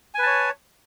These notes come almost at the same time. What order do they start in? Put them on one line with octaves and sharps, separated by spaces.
G#5 B4 A5 C#5